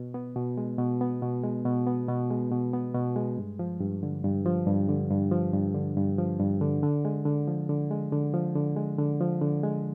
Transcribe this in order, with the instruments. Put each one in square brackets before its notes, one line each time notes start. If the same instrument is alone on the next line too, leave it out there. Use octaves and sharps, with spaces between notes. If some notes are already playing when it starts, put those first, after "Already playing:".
Already playing: [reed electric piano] B2
B3
B2
G#3
B2
B3
B2
G#3
B2
B3
B2
G#3
B2
B3
B2
G#3
G2
F3
G2
D3
G2
F3
G2
D3
G2
F3
G2
D3
G2
F3
G2
D3
D3
G#3
D3
F3
D3
G#3
D3
F3
D3
G#3
D3
F3
D3
G#3